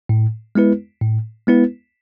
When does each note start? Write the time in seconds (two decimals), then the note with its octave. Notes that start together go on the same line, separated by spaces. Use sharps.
0.09 A2
0.55 G#3 B3 E4 B4
1.01 A2
1.47 G#3 B3 E4 B4